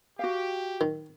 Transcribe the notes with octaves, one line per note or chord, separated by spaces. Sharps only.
F#4 G4 F5
D#3